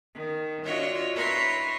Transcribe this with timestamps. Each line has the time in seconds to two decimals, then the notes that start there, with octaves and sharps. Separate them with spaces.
0.14 D#3
0.64 D4 F4 F#4 C#5 D#5 E5
1.14 E4 B4 C#5 A#5 C6